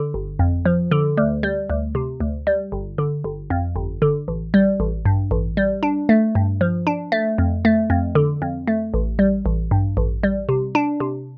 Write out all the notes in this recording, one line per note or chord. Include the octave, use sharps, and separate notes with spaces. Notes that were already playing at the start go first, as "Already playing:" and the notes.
Already playing: D3
G1
F2
F3
D3
D2
G3
D2
C3
D2
G3
G1
D3
G1
F2
G1
D3
A1
G3
A1
G2
A1
G3
D4
A3
G2
F3
D4
A3
F2
A3
F2
D3
F2
A3
A1
G3
A1
G2
A1
G3
C3
D4
C3